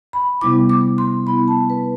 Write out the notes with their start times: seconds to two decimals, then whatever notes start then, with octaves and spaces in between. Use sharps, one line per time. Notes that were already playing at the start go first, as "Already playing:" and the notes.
0.13 B5
0.41 C3 G3 B3 E4 D6
0.69 D6
0.98 C6
1.27 C3 G3 B3 E4 B5
1.48 A5
1.70 B4